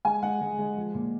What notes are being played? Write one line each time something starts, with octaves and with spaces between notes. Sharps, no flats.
G#3 G#5
G#3 F#5
G#3
G#3
F3
A#2